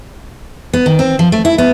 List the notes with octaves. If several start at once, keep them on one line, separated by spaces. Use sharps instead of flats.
B3
D#3
C4
F3
A3
E4
B3